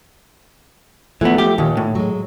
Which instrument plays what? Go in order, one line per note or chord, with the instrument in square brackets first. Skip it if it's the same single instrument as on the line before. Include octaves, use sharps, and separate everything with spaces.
[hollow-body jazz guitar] E3 B3 [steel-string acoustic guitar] F3 G#3 A3
[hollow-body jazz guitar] G4
[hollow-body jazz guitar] D#2 [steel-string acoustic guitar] A#2 D#3
[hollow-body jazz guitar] A2
[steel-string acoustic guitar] F#3 G#3